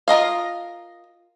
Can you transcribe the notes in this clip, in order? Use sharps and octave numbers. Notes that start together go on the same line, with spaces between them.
F4 A#4 D#5 F5